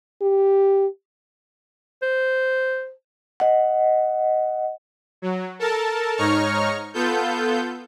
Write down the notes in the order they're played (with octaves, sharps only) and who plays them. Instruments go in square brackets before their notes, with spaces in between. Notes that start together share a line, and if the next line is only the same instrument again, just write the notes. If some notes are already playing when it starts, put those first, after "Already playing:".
[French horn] G4
[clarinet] C5
[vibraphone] D#5 F#5
[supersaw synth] F#3
A4 A#4 A5
G#2 D#4 C#5 A#5 C#6 F6
B3 F4 A4 G6